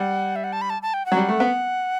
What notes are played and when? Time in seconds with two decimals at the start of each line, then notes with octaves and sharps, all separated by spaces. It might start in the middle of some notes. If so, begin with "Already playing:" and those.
Already playing: G3 F#5
0.36 E5
0.44 F#5
0.53 A5
0.61 B5
0.70 A5
0.82 A5
0.94 G5
1.06 F#5
1.12 F#3
1.17 G3
1.29 A3
1.40 B3